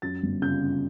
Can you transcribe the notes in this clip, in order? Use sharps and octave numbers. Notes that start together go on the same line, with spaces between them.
F#2 A6
G1
C#3 G6
C#3